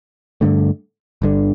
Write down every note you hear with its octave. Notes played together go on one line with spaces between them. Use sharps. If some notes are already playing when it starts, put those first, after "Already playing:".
G2 D3 A3
G1 G2 D3